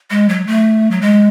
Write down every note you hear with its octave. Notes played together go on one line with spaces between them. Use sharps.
G#3
F#3
A3
F#3
G#3